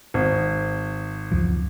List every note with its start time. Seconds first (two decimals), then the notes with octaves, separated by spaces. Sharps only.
0.14 G#1
1.32 C#2 F#2 F3